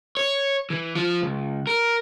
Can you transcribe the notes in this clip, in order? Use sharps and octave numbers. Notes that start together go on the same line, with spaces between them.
C#5
E3
F3 F4
C#2
A#4